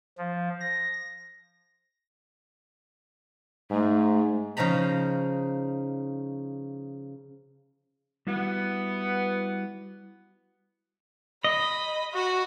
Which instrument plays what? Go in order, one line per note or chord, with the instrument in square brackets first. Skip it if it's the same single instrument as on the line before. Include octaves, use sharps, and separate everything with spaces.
[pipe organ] F3
A#6
[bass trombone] G#2 [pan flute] A3
[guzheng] C#3 F3 D#4 A#5 B5
[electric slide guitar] G3 E4 F#4 [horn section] B3
[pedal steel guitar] D#5 [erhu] B5
[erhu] F#4